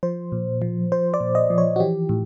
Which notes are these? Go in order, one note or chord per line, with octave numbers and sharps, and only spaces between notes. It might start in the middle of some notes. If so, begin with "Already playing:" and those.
F3 C5
A#2
F3
F3 C5
D5
A#2
D#5
F3
C#5
F#4
E3 G4
A2